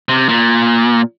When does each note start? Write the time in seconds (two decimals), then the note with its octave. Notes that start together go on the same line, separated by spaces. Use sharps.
0.09 C3
0.29 A#2